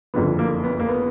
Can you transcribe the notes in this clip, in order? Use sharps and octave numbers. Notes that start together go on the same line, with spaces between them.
F#1 F2 D3 B3
A#3
B3
A#3
B3